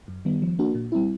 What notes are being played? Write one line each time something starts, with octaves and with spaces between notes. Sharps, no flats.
F#2
D#3 G3 B3
F3
A#3 D4 F#4
A#2
G3 C4 E4